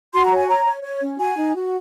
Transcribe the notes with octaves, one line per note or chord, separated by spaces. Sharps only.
F#4 C6
A#5
C#5
G#5
C#5 A#5
C#5
C#5
C#4
F#4 G#5
D#4
F#4